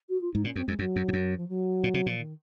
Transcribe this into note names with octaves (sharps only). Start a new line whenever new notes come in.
F#4
F4
G#2 D#4
A#2 C#4
F#2 C4
F2 G#3
F#2 F#3
F#2
G#2
F#2
F3
F#3
A#2
C3
A#2 F3
D#3